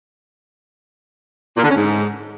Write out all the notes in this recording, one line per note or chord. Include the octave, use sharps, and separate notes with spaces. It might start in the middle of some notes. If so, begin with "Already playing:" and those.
A#2
D3
C#4
G#2